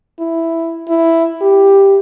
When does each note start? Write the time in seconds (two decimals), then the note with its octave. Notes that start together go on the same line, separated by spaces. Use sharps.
0.20 E4
0.89 E4
1.42 G4